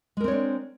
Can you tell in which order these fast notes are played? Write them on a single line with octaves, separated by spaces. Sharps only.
G#3 A#4 C4 C#5 D4